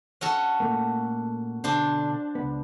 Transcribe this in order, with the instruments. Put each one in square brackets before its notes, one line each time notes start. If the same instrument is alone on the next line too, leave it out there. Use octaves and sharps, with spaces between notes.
[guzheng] C#4 F#4 A4
[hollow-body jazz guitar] A#2 A3 A#3
[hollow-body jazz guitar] B2 D3 [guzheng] D4 C5
[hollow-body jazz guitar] C#2 B3